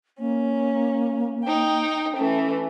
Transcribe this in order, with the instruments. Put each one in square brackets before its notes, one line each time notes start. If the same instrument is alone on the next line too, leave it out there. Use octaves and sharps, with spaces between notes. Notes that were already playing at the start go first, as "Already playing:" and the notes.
[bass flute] A#3 [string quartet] C#4
[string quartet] D#4 G5
[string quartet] E3 A3 [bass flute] C#4